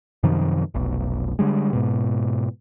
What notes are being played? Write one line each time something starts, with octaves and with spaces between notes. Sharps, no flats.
F#2 C3 D#3 F3
F1 B1
D3 G3 G#3
G#2 B2